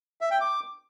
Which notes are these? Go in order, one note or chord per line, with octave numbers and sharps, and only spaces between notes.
E5
G5
D6